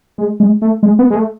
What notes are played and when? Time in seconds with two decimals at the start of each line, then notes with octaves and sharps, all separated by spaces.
0.18 G#3
0.40 G#3
0.62 A3
0.83 G#3
0.99 B3
1.10 G#3
1.16 A3